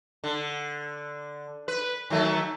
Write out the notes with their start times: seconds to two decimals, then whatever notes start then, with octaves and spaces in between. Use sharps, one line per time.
0.24 D3
1.68 B4
2.10 D#3 F#3 A3